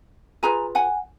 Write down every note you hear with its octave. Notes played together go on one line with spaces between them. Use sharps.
F4 G#4 B4 G#5 A#5
F#5 G#5